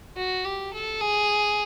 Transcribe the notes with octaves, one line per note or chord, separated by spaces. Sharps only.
F#4
G4
A4
G#4